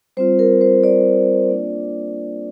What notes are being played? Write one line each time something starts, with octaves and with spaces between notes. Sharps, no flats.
G3 C4 F4 C5
A#4
C5
D5
A#3 D4 F4